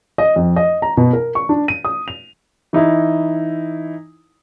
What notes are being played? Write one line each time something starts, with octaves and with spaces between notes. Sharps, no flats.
D#5
F2
D#5
A#5
B2
A#4
C#6
D4
D#7
D#6
F7
E3 D#4 E4